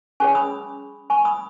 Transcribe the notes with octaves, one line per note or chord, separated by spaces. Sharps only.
C#4 G#4 C#5 G#5 C#6
B5 D#6
G#5 C#6
B5 D#6